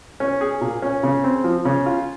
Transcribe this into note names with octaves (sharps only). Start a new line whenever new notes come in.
C#4
G#4
A#2
C#4
C#3
C4
F3
C#3
F4